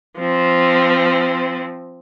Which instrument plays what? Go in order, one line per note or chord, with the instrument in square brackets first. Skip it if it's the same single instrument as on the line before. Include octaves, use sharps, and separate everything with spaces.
[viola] F3 C4